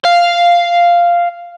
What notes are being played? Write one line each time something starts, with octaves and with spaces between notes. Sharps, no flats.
F5